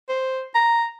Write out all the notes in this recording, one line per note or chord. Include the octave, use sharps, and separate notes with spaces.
C5
A#5